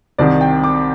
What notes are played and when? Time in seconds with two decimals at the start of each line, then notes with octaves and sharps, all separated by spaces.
0.18 C2 C3 D#3 D5
0.41 G5
0.64 D6